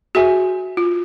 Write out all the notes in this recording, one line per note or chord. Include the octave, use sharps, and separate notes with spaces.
F#4 G#4 C5 E5 G#5
F4